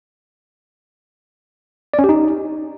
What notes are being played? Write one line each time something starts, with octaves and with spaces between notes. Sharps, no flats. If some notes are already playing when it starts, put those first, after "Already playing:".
D5
C#4
G4
D#4